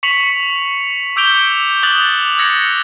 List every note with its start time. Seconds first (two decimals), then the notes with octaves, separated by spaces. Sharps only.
0.03 C#6 B6 C#7 F7 F#7
1.16 D6 E6 G6 D7 F7 G7
1.83 D6 D#6 F#6 A6 F7 F#7
2.38 E6 G#6 A#6 C#7 F#7